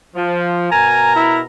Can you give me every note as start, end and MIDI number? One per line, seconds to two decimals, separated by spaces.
0.15 0.70 53
0.71 1.43 47
0.71 1.43 70
0.71 1.13 80
0.71 1.43 82
1.15 1.41 64